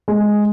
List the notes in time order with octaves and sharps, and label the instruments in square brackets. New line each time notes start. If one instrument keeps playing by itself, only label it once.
[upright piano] G#3